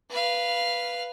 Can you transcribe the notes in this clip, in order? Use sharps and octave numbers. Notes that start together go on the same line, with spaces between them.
B4 F5